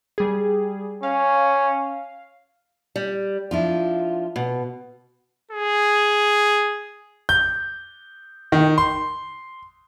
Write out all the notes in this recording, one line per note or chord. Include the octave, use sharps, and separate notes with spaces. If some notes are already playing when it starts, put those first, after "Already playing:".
G3 G#4
C#4 F5
G3
F3 D4 E4 F4
B2
G#4
G6
D#3
C6